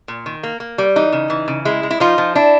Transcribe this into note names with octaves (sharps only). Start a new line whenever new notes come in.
A#2
D#3
A#3
A#3
G3
E3 D#4
C#3
E3
C#3
G#3 E4
G#3
E4
F3 D#4 F4
F3
D4 E4